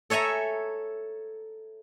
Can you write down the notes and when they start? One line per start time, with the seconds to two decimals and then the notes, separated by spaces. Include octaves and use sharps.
0.10 A4 C#5 E5 G#5 A#5